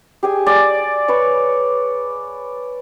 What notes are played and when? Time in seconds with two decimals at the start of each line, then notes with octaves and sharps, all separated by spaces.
0.23 G4 G#4 G#5
0.46 D5 G#5
1.08 B4 C#5 C#6